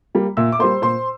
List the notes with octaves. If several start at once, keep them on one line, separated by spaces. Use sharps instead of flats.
G3 A#3
A#2 E5 E6
D6
G3 A#3 C5 C6
A#2 C5 C6